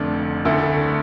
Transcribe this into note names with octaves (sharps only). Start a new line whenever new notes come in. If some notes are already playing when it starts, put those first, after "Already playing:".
Already playing: F1 F2 D3 A3 D4
D2 D3 A3 E4 A4